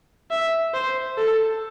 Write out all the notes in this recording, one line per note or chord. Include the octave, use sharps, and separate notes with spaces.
E5
C5
A4